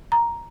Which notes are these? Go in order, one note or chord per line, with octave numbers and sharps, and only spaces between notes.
A#5